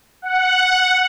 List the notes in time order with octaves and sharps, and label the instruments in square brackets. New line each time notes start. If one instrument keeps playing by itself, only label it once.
[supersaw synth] F#5